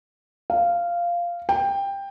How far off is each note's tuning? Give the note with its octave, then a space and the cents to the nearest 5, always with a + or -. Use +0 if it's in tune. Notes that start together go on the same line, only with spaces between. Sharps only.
F5 -10
G5 +15